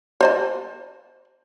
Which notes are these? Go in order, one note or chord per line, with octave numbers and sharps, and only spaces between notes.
C5 D#5 A5